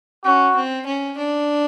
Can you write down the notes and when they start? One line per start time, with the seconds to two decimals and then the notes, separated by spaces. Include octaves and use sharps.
0.24 C#4 F#4
0.56 C4
0.86 C#4
1.17 D4